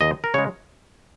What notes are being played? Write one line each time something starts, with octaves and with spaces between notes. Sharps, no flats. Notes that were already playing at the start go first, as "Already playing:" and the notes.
D#2 D#5
A#4
C#3 G#3 C#5